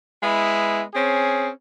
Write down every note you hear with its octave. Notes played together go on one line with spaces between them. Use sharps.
G#3 B3 E4
C4 C#4 G#4